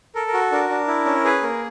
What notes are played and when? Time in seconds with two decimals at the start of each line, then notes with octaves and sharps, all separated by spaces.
0.15 A4 A#4
0.27 A#4
0.34 F#4
0.52 D4 A#4
0.70 D4
0.88 E4
1.05 C#4
1.24 G#4 B4
1.43 A#3 A#4